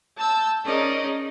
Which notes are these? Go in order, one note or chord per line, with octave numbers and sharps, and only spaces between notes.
A5 E6 G6
C#4 D#4 G#4 A#4 D5 D#5